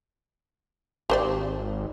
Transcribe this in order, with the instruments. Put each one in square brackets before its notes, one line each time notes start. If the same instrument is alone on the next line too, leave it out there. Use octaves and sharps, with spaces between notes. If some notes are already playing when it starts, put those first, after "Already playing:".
[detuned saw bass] G#1 [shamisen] G4 C5 D5